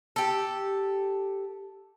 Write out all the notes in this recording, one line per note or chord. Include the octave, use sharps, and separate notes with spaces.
G4 A4